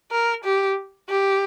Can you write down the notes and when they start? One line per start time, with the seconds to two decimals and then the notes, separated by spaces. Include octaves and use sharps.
0.12 A#4
0.44 G4
1.09 G4